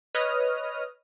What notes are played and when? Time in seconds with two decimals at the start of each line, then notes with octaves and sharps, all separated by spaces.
0.15 B4 C#5 D#5 D#6 F6